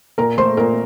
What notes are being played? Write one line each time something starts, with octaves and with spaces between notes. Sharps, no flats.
A#2 A#4 A#5
A3 C5 C6
A#2 A#4 A#5